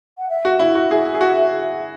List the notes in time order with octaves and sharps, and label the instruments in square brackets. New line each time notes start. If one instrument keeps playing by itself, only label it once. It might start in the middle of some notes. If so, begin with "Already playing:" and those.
[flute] F#5
E5
[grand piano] F#4
E4
F#4
[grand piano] G#4 [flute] E5
[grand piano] G#4
F#4